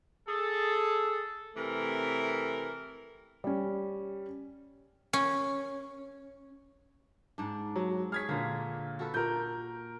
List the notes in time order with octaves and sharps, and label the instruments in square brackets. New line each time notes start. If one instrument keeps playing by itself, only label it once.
[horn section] G#4 A4
C3 E3 A3 A#4
[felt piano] G3 C#4
[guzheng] C#4
[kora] G#2 D4
[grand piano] F#3
[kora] G#4 C#5 [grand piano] F6 G#6 B6
[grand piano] A#2 D3 [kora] A#3
[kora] F#4 A4 B4
[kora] A#2 [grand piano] A#4 G6